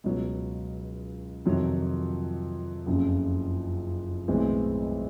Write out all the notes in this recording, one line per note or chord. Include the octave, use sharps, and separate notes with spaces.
C#2 B2 F#3
F2 C3 D#3 F#3
F#1 F2 C#3
B1 A2 E3 G#3 C4